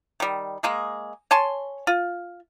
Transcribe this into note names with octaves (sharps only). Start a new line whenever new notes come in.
D#3 G3
G#3 A#3 G#4
C#5 G#5 A5 C6
F4